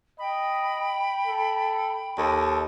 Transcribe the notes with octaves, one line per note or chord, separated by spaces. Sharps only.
D#5 G5 B5
A4
D#2 A4